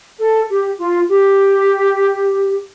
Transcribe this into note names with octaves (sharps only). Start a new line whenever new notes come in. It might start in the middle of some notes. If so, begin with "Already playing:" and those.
A4
G4
F4
G4